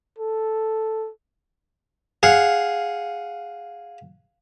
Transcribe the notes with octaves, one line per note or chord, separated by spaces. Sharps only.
A4
G#4 F5 F#5